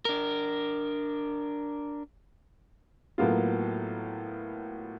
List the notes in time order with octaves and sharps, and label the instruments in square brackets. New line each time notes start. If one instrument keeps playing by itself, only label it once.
[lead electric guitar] D4 A#4
[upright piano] A2 F#3 A#3 B3 F4